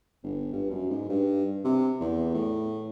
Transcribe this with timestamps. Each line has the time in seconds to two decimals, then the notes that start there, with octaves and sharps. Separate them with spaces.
0.24 G1
0.53 G2
0.70 F#2
0.90 G#2
1.09 G2
1.64 C3
2.01 E2
2.34 A2